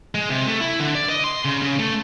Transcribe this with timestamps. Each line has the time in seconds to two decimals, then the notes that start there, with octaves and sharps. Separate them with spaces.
0.15 G#3
0.30 C3
0.47 A3
0.61 E4
0.79 D3
0.95 D5
1.09 D#5
1.24 C6
1.45 C#3
1.62 C#3
1.79 A3